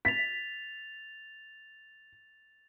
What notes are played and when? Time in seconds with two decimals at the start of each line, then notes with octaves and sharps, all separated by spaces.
0.05 A6 B6 F7